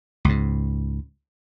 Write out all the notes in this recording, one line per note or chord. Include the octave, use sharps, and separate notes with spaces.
C#2 G#2